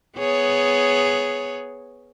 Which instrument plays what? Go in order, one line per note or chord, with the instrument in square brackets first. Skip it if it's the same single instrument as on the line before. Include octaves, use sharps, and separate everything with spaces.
[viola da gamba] B3 G#4 C#5